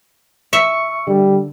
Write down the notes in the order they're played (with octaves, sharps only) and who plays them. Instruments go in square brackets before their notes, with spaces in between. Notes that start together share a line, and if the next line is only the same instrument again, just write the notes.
[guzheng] E5 [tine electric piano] C#6 C#7
[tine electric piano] D3 [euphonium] G3